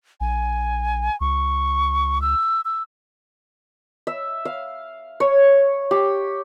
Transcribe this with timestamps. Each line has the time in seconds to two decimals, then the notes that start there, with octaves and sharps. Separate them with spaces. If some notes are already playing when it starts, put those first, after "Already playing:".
0.21 A#1 G#5
1.21 C#2 C#6
2.22 E6
2.65 E6
4.07 E5
4.45 F5
5.20 C#5
5.91 G4